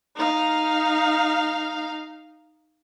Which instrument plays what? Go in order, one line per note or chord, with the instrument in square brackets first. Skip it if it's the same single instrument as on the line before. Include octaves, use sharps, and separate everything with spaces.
[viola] D#4 F5